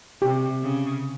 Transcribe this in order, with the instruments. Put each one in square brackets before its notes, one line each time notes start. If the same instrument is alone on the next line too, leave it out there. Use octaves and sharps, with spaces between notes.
[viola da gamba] C3 [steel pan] G4
[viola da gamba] C#3